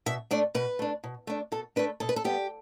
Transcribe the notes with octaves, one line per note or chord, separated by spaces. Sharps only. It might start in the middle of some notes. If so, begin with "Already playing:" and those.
B2 E5
A3 D4 D5
B2 B4
A3 D4
B2
A3 D4
B2 A4
A3 D4 B4
B2 A4
B4
A4
G3 B3 G4